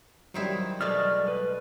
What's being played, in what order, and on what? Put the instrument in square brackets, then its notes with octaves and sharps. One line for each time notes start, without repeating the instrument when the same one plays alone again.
[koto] D#3 C4 E4 [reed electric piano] F#3 G3
[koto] B2 G#3 A3 [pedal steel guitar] D5 F6
[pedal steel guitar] B4